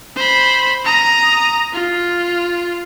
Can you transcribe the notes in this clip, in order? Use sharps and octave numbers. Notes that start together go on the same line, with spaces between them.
C5 B5
A#5 D#6
F4